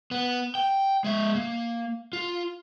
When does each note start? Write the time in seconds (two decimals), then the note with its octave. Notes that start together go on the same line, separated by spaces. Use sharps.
0.11 B3
0.55 G5
1.04 G#3 E5
1.35 A#3
2.13 F4